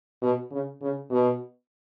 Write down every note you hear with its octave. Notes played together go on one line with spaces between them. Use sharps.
B2
C#3
C#3
B2